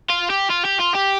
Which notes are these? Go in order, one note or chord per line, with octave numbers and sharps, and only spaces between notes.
F4
G4
F4
G4
F4
G4